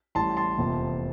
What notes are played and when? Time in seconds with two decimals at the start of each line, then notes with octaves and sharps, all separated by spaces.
0.15 A1 A2 G3 A5 C6
0.37 A5 C6
0.58 F1 E2 C3 F3 A#3